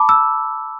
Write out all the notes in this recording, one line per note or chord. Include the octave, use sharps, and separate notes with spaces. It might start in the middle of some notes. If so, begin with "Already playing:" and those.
Already playing: A5 B5 D6
E6